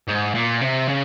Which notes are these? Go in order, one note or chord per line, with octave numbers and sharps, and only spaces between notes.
G#2
A#2
C3
C#3